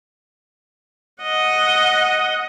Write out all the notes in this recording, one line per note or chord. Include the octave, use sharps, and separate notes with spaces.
D#5 F#5